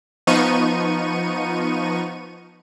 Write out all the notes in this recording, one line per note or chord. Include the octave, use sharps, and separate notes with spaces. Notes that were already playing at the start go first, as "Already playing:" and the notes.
F3 B3 D#4 C#6 D#7